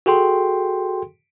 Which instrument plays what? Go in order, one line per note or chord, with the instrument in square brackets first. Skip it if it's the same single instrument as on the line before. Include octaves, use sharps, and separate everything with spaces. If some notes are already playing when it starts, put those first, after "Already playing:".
[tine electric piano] F#4 G#4 A4 G5 C6